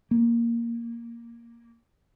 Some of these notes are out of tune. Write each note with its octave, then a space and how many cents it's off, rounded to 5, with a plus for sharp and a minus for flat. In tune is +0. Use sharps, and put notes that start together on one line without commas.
A#3 +0